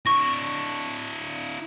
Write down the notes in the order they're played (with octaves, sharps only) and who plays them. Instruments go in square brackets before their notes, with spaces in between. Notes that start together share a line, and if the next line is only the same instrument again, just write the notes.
[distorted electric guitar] D4 E4 [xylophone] C#6 A#6